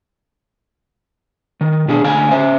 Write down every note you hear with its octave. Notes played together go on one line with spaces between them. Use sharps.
D#3
B2 D4 G#4
D2 F5 G#5
C#4 C5 E5